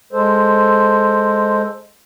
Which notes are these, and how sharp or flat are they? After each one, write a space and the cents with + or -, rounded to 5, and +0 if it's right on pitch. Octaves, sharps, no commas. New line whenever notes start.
G#3 +0 A4 +0 C5 +0